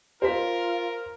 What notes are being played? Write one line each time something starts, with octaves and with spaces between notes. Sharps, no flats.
F4 A#4 C5 C6 B6